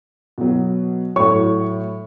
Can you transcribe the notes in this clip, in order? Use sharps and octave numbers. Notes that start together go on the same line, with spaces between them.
B2 F#3
A2 F#3 C#5 C#6